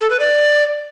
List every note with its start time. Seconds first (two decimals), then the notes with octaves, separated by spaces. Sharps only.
0.01 A4
0.10 B4
0.20 D5